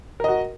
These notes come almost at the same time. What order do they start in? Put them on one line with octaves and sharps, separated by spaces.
A#4 D#5 F#4